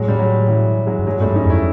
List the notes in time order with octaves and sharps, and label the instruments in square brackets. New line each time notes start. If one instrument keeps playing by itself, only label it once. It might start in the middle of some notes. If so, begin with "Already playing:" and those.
Already playing: [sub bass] A2 [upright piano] F#3 G#3
[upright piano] G3
F#3 G#3
E3 F#3
F#3 G#3
[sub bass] G2
[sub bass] G#2 [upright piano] F#3 G#3
[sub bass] G2 [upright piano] G3 A3
[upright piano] C#4 D#4
[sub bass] F2 [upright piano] D4 E4